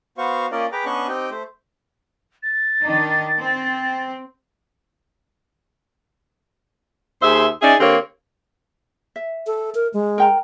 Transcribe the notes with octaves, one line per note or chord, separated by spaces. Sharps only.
B3 F#4 C5 F5 C#6
A#3 C#4 F4 A#4 D5 D#5
G#4 B4 G5 A#5 D6
B3 C#4 D4 D#5 C#6 F#6
C4 D#4 G4 D#5 G5
A3 C5
A6
D#3 D4 D#4
C4
D#2 G#4 C5 E5
C#4 D#4 G#4 D5 E5
D3 A#3 C4 G4 C#5
E5
A4
A#4
G#3
A#4 G5 A#5